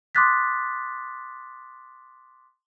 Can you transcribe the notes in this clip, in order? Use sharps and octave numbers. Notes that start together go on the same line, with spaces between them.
C6 D6 D#6 F#6 A6 B6